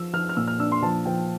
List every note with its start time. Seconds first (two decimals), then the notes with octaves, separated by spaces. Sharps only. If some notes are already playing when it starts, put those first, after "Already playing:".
Already playing: F3 E6
0.13 F3 F6
0.29 F6
0.37 A#2 E6
0.48 F6
0.59 D4 E6
0.72 C6
0.82 F3 A5
1.05 F3 G5